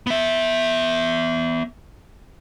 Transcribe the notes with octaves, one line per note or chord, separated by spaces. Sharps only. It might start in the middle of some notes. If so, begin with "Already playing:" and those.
B3 E5